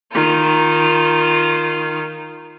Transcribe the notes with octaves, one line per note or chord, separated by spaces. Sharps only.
D#3 F4